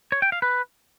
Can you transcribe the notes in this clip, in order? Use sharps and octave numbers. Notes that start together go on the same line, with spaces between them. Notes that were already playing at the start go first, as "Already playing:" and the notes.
C#5
G5
F5
B4